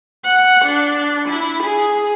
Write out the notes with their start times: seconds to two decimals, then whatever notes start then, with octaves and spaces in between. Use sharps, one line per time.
0.24 F#5
0.65 D4
1.29 E4
1.63 G#4